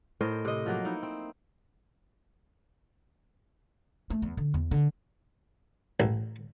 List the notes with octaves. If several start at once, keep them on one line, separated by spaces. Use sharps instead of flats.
A2 A#4 C5 D#5
C3 D#5
F3 F#3 A#3
D#4 E4
C4
A3
E2
D3
E2
D3
A1